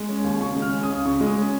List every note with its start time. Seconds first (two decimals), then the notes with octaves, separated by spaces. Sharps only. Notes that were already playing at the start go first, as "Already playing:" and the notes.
Already playing: G#3
0.09 C#4
0.24 D#2
0.40 C#3 C#6
0.56 G#3
0.62 F6
0.72 C#4
0.83 D#6
0.89 C#2
1.05 C#3 C#6
1.21 G#3
1.26 D#6
1.38 C#4